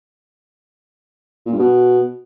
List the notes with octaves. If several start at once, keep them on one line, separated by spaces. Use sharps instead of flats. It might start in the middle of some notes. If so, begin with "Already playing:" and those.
A#2
G2
B2